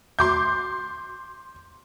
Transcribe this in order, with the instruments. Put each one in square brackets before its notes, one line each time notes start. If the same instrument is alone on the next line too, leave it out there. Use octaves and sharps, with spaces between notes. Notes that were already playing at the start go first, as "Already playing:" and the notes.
[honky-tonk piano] C6 D6 G6